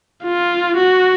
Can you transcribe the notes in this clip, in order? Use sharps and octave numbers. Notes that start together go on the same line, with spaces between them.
F4
F#4